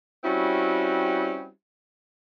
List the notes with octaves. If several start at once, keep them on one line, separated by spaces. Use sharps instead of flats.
G3 C4 C#4 E4 F#4